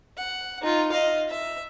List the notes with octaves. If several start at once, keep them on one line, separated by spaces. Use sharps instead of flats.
F#5
D#4 F4
D#5 F5
E5